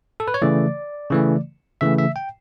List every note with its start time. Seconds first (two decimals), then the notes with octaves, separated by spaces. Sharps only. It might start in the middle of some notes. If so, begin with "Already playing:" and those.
0.20 A4
0.28 B4
0.34 C#5
0.42 C#3 E3 A3 D5
1.11 C#3 E3 A3
1.81 C#3 E3 A3 E5
1.98 E5
2.16 G5